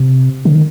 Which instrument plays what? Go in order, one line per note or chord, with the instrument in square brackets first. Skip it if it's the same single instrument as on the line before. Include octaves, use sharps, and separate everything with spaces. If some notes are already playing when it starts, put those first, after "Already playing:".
Already playing: [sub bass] C3
D3
D#3